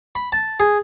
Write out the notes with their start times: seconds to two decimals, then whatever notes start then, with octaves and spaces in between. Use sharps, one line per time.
0.15 B5
0.32 A5
0.60 G#4